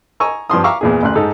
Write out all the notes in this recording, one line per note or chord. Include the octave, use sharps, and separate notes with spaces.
D#5 G#5 A#5 C#6 E6
G2 F3 C6 D#6
E5 F5 A#5 C#6 D6 E6
E2 A#2 G#4
A1 D2 C6 F#6
G#2 D#4 A4